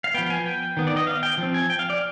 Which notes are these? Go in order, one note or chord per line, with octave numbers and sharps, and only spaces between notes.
F5
F3 B3 G5
G#5
G5
D#3 B3
D5
D#5
F5
G5
F3 C4
G#5
G5
F5
D5